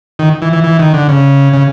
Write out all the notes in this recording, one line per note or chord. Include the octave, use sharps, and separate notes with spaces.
D#3
E3
E3
E3
D#3
D3
C#3
C#3